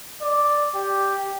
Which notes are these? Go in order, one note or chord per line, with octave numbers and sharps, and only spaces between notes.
D5
G4